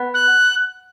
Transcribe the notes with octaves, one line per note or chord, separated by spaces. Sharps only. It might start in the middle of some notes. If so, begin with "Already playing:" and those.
Already playing: B3
F#6